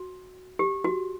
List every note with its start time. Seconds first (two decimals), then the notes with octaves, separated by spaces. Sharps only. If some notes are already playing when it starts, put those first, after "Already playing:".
Already playing: F#4
0.59 G4
0.84 F#4